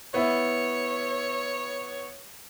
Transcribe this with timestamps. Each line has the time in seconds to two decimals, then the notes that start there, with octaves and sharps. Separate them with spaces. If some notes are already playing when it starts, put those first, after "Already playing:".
0.14 B3 E4 C#5